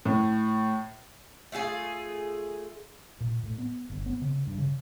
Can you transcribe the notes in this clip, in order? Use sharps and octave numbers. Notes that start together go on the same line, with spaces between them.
A2
A3 F4 F#4 G#4
A#2
A2
B3
G1
B3
C#3
G2
C#3